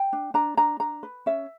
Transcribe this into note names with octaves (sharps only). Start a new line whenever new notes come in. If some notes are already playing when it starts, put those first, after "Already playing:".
Already playing: G5
D4
D4 A#5
D4 A#5
D4 A#5
B4
C#4 E5